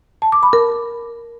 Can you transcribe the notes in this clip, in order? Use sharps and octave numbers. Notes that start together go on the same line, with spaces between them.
A5
D6
B5
A#4